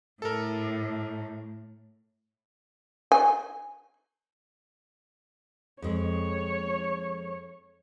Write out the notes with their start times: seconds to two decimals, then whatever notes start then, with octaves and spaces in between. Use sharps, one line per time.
0.22 A2 A4 A#4
3.12 G#5
5.82 F2 G#3 C#5